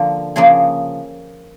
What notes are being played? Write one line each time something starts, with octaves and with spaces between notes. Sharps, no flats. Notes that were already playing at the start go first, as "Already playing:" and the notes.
Already playing: D3 F3 A#3
C#3 F3 A#3 G#4